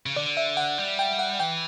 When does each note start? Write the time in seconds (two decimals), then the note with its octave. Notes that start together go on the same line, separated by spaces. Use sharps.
0.06 C#3
0.16 D3 D5
0.37 E5
0.57 F#5
0.78 G3
0.99 G5
1.19 F#5
1.40 E3 G5